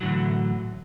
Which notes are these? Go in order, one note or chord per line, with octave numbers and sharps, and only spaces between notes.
A2 D3 E3 F#3